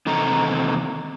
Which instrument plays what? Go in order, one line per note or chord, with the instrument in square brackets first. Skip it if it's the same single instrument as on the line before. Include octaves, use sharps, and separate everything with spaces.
[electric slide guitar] E2 C3 D#3 A4 D#5 A#5